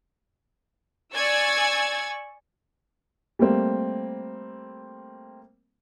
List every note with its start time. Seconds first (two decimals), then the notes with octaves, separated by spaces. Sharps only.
1.15 D5 G#5 C#6 E6 G#6 A6
3.39 G3 A3 A#3 C4